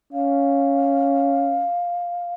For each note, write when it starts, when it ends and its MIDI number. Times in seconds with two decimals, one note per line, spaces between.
0.12 1.67 61
0.12 2.34 77